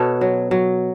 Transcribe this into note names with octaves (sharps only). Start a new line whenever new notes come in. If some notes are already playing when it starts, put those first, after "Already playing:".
Already playing: B2 A4 B4 C#5
F#3
F#3